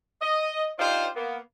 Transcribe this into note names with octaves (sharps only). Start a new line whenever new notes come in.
D#5
D4 D#4 F4 G4 C5
A#3 B3